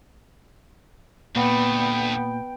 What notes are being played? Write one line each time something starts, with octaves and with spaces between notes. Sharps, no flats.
D2 A#2 A3 B3 G5